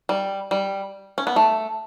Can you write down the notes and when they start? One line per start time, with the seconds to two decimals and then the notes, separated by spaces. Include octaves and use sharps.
0.09 G3
0.51 G3
1.18 C#4
1.27 B3
1.36 A3